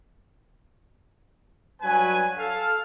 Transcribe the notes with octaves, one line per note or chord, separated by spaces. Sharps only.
G2 F#3 B4 G#5
A4 F5